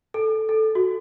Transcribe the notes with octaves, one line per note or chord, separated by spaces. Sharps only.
A4
A4
F#4